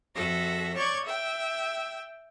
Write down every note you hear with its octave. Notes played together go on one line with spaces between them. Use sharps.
F2 F#4 A4 E5 A#6
C#5 D5 C#6 G6 G#6
E5 G5